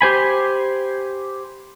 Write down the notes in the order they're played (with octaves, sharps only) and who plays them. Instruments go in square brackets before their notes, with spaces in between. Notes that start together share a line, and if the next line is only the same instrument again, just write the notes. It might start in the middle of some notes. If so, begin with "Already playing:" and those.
[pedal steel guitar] G4 C5 G#5 B5